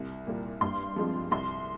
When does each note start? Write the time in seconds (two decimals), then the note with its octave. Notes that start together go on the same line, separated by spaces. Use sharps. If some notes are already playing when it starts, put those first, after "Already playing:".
Already playing: C2
0.27 A#2 G3 A#3
0.61 G2 C6
0.96 F3 G#3 C4
1.31 C2 C6